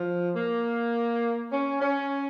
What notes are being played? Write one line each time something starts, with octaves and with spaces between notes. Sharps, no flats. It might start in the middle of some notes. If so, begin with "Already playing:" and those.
Already playing: F3
A#3
C#4
C#4